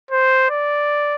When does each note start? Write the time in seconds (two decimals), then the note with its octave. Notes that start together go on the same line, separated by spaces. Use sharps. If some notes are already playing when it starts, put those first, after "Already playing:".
0.11 C5
0.50 D5